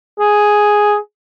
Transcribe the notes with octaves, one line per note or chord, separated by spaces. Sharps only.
G#4